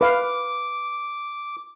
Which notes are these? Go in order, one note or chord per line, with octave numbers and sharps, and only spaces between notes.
B4 F5 D6